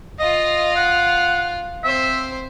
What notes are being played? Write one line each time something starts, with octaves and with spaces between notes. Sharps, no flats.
F4 D#5 F5
F#5
C4 C5 E5